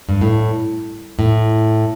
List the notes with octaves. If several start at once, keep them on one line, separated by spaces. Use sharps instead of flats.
G2
A2
A2